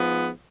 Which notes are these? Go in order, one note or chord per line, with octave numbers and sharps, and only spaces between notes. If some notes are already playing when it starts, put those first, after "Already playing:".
Already playing: G#2 F3 B3